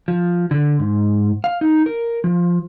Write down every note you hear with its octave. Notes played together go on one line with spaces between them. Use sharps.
F3
D3
G#2
F5
D#4
A#4
F3